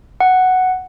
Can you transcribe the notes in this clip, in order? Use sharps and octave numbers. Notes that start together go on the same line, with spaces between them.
F#5